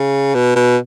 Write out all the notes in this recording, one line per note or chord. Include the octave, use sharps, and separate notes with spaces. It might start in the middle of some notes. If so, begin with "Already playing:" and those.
Already playing: C#3
B2
B2